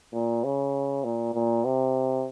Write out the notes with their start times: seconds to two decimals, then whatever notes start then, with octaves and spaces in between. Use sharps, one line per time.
0.13 A#2
0.44 C#3
1.04 A#2
1.34 A#2
1.65 C3